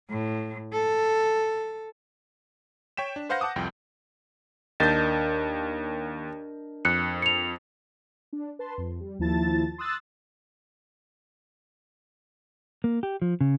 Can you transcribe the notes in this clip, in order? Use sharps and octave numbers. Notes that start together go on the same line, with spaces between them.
A2
A4
C#5 G5 B6 E7
D4
B4 C5 F5 F#5 G6 A#6
F#5 A5 D6 D#6
C2 F2 G5
D#2 D4 A#4 D#5 G6 A6
F2 F#6 C#7
C#7 F7
D4
B4 A5 C6
F2
G3
D#2 F3 E4 A5 A6
C6 D#6 E6 F#6 A6
A#3
G4
F3
C#3